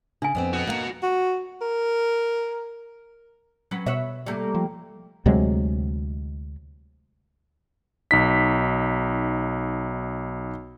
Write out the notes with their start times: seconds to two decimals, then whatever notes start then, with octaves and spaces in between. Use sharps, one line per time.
0.22 C#3 D4 G#5
0.35 F2 B3 C4
0.53 F#4 D#5
0.67 A#3 F5 A#5
1.03 F#4
1.61 A#4
3.71 F#3 C#4 B4
3.86 B2 B4 C#5 E5
4.26 G3 A3 A#3
4.55 F3
5.26 D2 C3 F#3 G#3
8.11 B1 D#4 B6